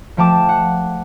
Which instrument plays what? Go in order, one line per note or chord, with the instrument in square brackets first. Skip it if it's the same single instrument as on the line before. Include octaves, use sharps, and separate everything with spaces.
[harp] F3 A3 G5 A5 D6 E7
F#5